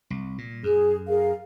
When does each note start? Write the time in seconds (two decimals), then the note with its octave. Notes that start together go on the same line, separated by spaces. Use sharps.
0.10 C2
0.38 A#2
0.63 F#2 G#4
1.08 G#4 A#4 F5